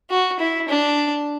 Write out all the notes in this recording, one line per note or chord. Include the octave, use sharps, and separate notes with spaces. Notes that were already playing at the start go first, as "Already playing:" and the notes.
F#4
E4
D4